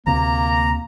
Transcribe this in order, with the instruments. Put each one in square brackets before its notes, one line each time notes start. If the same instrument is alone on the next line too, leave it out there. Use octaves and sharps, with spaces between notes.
[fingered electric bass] D2 C3 [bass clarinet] A#3 [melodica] A#5